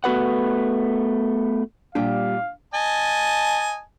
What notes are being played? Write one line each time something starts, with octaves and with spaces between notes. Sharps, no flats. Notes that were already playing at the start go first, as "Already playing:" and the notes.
A3 B3 F#4 B4 F#5
A#2 G3 D4 G4 F5
D#5 G#5 A5